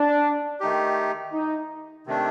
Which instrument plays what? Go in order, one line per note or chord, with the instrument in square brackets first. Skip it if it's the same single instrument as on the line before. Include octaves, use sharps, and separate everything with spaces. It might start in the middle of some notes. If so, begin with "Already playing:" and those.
Already playing: [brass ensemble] D4
[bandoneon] D#3 A3 D#4 G4
[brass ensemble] D#4
[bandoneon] C3 D#3 A3 D4